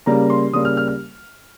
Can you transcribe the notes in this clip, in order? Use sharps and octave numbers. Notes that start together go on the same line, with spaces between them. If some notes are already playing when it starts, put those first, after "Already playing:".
C#3 G3 A#3 A#5
C6
C#3 G3 A#3 D#6
F6
F6
F6